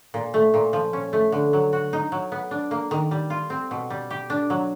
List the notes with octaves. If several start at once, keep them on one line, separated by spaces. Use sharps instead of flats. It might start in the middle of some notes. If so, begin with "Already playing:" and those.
A#2
A3
A#2
F3
C#4
A3
D3
F#3
F#4
D#4
F#3
B3
D4
A#3
D#3
G3
F4
C4
B2
G3
G4
D4
F#3